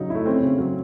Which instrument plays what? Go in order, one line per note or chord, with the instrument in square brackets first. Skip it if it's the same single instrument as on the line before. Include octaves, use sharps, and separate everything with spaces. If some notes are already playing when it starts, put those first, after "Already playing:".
Already playing: [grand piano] C#3 F#3 C#4 [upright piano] D#4
[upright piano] A3 [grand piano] E4
[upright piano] C4 [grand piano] C#4
[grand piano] C#3
F#3